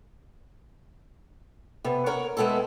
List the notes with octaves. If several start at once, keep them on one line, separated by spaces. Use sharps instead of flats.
C3 B3
A#4 C#5 F#5
G#3 B3 C4 E4 A4